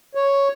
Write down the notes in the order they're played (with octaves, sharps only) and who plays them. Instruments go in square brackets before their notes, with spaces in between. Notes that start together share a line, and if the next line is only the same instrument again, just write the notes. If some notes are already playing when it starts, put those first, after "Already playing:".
[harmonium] C#5